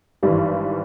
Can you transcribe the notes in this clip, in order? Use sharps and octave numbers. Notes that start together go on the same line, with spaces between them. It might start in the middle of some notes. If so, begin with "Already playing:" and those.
G#1 G2 E3 G3